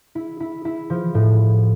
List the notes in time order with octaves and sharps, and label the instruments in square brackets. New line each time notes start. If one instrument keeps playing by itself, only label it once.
[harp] E4
E4
E4
F3
A2